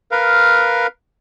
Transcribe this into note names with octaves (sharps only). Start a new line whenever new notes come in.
A#4 B4 F5